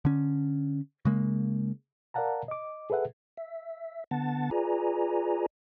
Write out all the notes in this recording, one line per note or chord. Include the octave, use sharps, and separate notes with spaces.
D3 C#4
C#3 G#3 A#3
A#4 D5 F5 F#5 A5 A#5
D#5 D6
G#4 A4 B4 E5 F#5
E5
D3 B3 F#5 A5 A6
F4 G#4 B4 D5 G#5 A#5